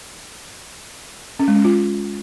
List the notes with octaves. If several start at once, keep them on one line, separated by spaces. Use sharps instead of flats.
C#4
G#3
C#4
F4